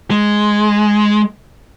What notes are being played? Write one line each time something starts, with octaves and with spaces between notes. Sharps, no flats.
G#3